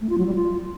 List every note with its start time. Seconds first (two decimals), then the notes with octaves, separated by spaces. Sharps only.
0.01 A3
0.09 F4
0.18 F#3
0.26 G3
0.35 F4